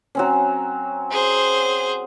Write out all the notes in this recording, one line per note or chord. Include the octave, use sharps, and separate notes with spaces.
F#3 C4 C#4
G#4 C5